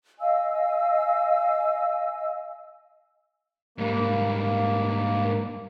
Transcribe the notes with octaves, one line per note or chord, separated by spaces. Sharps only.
D#5 F5 G#5 E6
G#2 G3 A#3